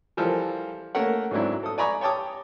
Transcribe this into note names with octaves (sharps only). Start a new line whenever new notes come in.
E3 F3 G3 A4 A#4
A3 A#3 C#4 A#4 F#5
G#2 F#3 C4 D4 E4
A4 D#6
D5 G#5 A#5 B5 C#6 D#6
C#5 G5 A5 D6 D#6